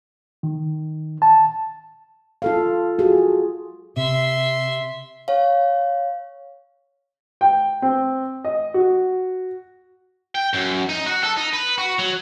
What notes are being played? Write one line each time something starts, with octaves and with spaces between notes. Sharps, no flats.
D#3
A5
F4 A4 F5
F4 F#4 G#4
C3 E5 C6
C#5 F5
G5
C4
D#5
F#4
G5
F#2
D#4
F#4
A4
D#4
B4
F#4
F#3